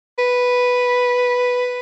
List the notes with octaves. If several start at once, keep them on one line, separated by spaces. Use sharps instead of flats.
B4